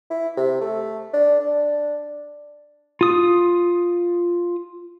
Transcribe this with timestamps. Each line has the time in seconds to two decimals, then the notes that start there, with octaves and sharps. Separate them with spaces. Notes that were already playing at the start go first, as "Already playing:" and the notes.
0.10 E4
0.37 C3
0.61 A3
1.13 D4
1.40 D4
3.01 F4 D#6